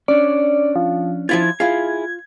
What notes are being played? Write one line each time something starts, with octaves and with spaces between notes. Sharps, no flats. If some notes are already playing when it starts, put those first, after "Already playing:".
C#4 D4 C#5 D5
F3
F3 E4 F4 G#6
E4 F4 G#4 F5